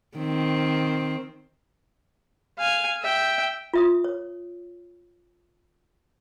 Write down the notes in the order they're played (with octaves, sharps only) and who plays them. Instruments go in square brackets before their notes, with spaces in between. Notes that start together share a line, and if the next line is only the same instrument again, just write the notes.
[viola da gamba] D#3 C4
[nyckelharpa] F5 G#5
E5 G5
[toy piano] F4 E5 D#6
C#5